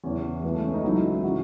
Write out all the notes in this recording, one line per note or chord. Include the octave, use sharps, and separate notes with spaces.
E2 C#3 E3 C#4
C#2 C#3 E3 B3
A3
C#4
D#4
C#2 C#3 F#3 E4
C#3 E3 F#4